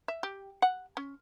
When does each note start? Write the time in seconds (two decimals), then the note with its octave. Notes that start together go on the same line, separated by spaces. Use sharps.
0.08 E5
0.23 G4
0.62 F#5
0.97 C#4